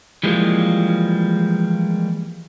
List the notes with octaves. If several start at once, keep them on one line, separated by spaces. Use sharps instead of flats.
E3 F3 G3 G#3 A#3